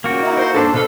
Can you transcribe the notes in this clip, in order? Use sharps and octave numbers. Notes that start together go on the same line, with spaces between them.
A#2 C#3 A#3 F#4 G5
D#4 E4
A#4 C5
G#2 C4 D4 A4 B4 C5
B2 A4 B4 F5